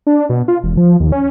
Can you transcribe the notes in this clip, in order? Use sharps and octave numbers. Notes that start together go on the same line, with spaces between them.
D4
B2
F4
E1
F3
D#2
C#4